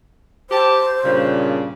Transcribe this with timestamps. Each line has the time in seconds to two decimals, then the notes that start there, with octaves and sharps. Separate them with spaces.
0.50 G4 C5 A5
1.04 G2 A#2 C#3